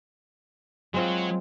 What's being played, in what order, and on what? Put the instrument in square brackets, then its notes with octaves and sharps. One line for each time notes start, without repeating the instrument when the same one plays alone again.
[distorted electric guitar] F#3 [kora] G#3 C4 F4